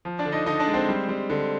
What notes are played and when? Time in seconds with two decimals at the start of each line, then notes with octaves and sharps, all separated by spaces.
0.05 F3
0.19 D4 D5
0.25 D3
0.32 D#4 D#5
0.46 D3 D#4 D#5
0.60 D4 D5
0.67 G#3
0.74 C4 C5
0.88 G3
1.09 G3
1.30 D3